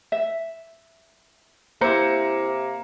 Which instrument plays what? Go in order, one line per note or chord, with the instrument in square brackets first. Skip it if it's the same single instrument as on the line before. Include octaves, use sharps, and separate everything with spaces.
[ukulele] E5
[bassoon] C3 [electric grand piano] A#3 A#5 C#7 [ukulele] E4 C5